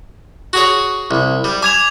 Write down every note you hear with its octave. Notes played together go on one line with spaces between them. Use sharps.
F#4 G#4 C#5
C2
G3
G#5 D6 G#6 F7